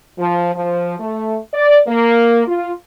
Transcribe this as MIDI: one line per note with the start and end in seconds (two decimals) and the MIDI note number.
0.19 0.54 53
0.55 0.96 53
1.00 1.38 57
1.53 1.79 74
1.87 2.42 58
2.47 2.72 65